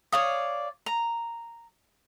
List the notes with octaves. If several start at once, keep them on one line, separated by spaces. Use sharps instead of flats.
C#5 D5 F5 D#6
A#5